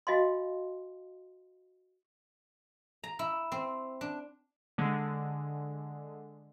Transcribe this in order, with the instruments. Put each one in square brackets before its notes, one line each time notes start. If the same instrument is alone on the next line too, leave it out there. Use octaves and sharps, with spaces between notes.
[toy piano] F#4 D#5 F5 G#5 C6
[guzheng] A#5
E4
C4
D4
[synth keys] D3 G#3